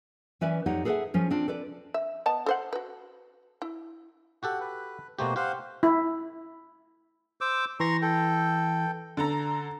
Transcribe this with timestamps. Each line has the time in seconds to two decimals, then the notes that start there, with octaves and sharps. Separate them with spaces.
0.41 E3 C#4 B4 D5 E5 G#5
0.66 F2 D#4 G4 C#5 F#5
0.85 G#4 A4 B4 D5 E5 F#5
1.14 F3 C#4 C#5
1.31 C4 D4 F4
1.48 A4 B4 D5
1.94 E5
2.26 B3 D#5 A5
2.46 A4 C5 F#5
2.73 F#4 B4
3.62 E4
4.43 F#4 G4 A4 F#5
4.60 B4
5.19 B2 A3 A#3 F#4 G4 C5
5.36 G4 C5 F5 F#5
5.83 E4
7.41 C5 D6 E6
7.80 E3 A#5 C6 C#6 A#6
8.02 A4 G5
9.17 D3 A4 A#5